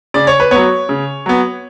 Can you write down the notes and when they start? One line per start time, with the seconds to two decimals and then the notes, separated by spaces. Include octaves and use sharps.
0.14 C#3 D5
0.27 C#5
0.40 B4
0.51 F#3 B3 C#5
0.89 C#3
1.26 F#3 B3